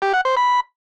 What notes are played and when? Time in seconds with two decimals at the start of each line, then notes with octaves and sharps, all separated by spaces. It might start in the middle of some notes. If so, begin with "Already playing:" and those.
0.02 G4
0.14 F#5
0.25 C5
0.37 B5